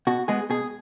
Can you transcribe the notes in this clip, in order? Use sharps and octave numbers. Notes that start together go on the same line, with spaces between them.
B2 F#4
G#3 B3 G#4
B2 G#4